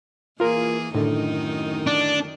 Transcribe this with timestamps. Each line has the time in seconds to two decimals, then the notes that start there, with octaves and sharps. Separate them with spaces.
0.40 E3 A#3 F4 G#4 A#4
0.95 F#2 A2 D3 D#3 D#4
1.87 D4